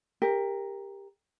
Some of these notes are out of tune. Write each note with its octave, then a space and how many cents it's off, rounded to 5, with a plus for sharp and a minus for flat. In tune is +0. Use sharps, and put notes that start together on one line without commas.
G4 +20 A#4 +0